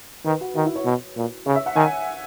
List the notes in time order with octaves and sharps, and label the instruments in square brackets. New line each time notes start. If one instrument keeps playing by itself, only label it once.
[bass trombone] D#3 [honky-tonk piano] B4
[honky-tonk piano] F#4
[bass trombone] D#3 [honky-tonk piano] F#4
[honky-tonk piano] E4
C#5
[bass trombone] B2
A#2
[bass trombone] C#3 [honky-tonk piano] C#5
[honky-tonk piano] E5
F#5
[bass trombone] D#3 [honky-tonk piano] G#5